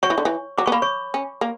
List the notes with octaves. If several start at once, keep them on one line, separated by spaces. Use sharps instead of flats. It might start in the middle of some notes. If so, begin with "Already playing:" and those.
F#3 C#5 C#6
E3
D3
E3
F#3 D6
B3 C#6
A#3 B5
C#5 C#6
C#4
A#3